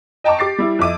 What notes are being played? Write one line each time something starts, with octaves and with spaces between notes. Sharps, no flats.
D#5 G5 A5 A#5 C#6 D6
G4 D6 A6 C7
G3 E4
F2 E5 D6 D#7